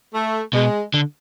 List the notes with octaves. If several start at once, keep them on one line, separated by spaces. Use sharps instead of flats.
A3
B2 G#3
D3